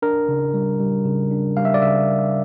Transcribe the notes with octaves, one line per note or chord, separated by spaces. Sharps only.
D4 A#4
C#3
G3
G3
C#3
D4
G3 F5
E5
D5
C#3 E5
C#3